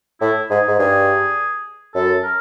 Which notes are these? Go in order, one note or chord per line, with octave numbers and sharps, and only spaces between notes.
A2 E4
G#2 G#4
G#2
G2 G#4
F#2 A4
A#4